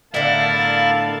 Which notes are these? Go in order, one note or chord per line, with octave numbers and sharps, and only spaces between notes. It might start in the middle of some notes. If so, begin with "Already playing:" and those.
A2 D3 B3 E4 A#4 D5 F5 A5